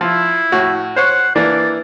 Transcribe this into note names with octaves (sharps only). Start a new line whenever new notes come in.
F3 E4
A2 F#4
C5 C#5 F#5 C#6
E3 A#3 D4 D5